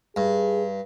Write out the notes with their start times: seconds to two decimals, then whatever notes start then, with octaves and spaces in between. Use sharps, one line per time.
0.16 G2 G#4